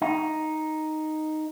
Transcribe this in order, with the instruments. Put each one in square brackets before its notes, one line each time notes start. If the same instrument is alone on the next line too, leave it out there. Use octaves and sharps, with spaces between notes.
[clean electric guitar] D#4